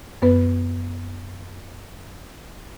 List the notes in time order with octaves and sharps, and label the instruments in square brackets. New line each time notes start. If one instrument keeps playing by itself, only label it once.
[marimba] F#2 B3 B4